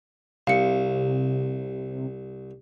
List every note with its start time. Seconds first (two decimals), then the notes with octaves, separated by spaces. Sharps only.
0.47 C2 C3 F5 C#7